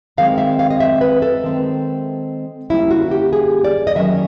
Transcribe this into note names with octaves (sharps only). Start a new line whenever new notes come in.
D#3 G#3 C4 F5
E5
F5
D#5
E5
B4
A4
D#3 G#3 C4
D3 G3 A#3 C#4 E4
F#4
G4
G#4
D5
D#5
D#3 F#3 A#3 C#4 E5